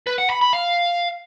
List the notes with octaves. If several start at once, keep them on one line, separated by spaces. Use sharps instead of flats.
B4
F#5
B5
B5
F5